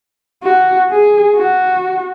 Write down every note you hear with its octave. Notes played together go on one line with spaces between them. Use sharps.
F#4
G#4
F#4